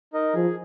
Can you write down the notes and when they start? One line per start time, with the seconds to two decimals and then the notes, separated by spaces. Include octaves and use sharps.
0.13 D#4 A#4 D#5
0.34 F3 G#4